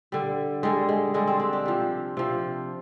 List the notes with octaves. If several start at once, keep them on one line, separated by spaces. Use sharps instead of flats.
D3 G3
D3 G3 G#3
G#3
D3 G3 G#3
C4
D4
G4
C3 F3
C3 F3